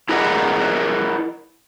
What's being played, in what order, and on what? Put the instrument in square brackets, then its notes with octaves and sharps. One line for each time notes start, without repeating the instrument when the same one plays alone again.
[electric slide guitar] E4 G#4 A#4 B4 D#5 F#5